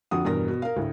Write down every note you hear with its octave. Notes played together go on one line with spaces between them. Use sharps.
F2 D3 F#4 F#5 D#6
E2 G2 B2 A#4 A#6
B2
A#4 F5
D2 A2